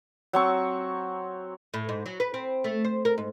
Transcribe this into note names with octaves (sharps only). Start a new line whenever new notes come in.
F#3 C4 C#6
A2
G#2
F#3
B4
C4
A3
C5
A#4
G#2